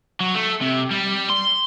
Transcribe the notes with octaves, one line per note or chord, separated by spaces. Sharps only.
F#3
A3
C3
G3
C6